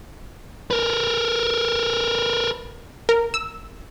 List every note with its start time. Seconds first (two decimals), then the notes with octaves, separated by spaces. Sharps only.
0.71 A#4 B4
3.09 A#4
3.34 E6